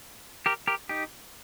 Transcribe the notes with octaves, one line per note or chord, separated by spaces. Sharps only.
G4 A#4
G4 A#4
D#4 G4